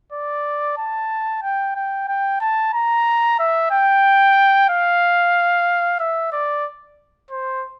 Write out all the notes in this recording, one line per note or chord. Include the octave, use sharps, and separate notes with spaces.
D5
A5
G5
G5
G5
A5
A#5
E5
G5
F5
E5
D5
C5